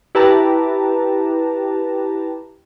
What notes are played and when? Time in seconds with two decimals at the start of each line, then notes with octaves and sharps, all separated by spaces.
0.15 E4 G4 B4 A5 A#5